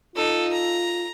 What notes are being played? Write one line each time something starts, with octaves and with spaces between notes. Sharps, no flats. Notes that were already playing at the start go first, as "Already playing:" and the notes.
D#4 F4 A4
A#5